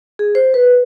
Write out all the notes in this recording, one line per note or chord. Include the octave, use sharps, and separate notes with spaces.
G#4
C5
B4